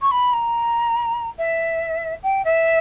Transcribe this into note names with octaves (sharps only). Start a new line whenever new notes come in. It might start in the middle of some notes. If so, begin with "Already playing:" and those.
C#6
B5
A#5
E5
G5
E5